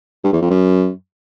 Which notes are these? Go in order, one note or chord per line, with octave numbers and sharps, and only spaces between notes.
G2
E2
F2
F#2